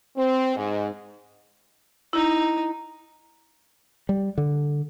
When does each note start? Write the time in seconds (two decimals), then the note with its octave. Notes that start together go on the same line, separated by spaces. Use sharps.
0.17 C4
0.56 G#2
2.13 D#4 E4
4.09 G3
4.38 D3